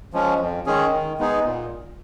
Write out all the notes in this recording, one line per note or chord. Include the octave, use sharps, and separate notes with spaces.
F3 G#3 C#4
F2
D#3 G#3 C#4 G#4
D#3
G#3 B3 D#4 G#4
A#2